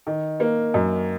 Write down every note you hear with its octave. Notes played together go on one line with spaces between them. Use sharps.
D#3
A#3
F#2